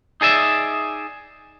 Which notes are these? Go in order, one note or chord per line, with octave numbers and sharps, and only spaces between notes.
D#4 G#4 D5 E5